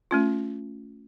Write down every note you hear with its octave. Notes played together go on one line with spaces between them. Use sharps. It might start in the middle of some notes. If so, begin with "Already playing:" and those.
A3 C#4 F4